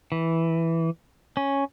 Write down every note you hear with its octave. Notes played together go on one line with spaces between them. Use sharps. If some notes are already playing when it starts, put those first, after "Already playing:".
E3
C#4